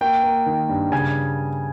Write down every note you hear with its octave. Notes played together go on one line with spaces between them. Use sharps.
A#3 G5
A#3
D#3
G2
C#3 G#5